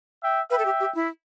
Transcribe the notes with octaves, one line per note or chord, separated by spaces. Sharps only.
E5 G5
B4 E5 G5
A4
G4
G4
E4